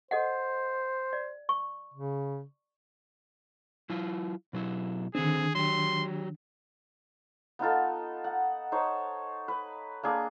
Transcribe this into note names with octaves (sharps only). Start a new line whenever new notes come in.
A4 C5 D#5 F#5
D5
C#6
C#3
F#3 E4 F4
B2 F#3 E4
D3 D#3 C4 D4 G#4
F#3 G4 C6
B3 D#4 F4 A4
F#5
D#4 C5 C#5 A5
B4
A#3 D4 G#4